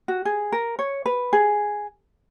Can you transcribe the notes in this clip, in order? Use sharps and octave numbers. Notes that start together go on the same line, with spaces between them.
F#4
G#4
A#4
C#5
B4
G#4